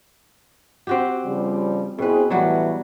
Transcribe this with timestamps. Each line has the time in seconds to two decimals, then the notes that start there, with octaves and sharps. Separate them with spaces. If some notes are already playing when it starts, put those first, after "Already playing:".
0.87 C4 F#4 G4
1.25 C#3 F3 G3
1.98 B2 C4 E4 G#4 B4
2.30 A2 E3 F#3 G3 F#4